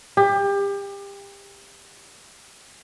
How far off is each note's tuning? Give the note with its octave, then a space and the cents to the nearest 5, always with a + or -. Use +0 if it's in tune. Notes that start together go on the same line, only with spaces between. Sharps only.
G4 +30